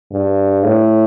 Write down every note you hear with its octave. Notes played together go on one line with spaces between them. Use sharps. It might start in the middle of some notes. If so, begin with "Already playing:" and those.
G2
A2